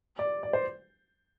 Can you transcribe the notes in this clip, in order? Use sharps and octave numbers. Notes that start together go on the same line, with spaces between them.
D5
D5
C5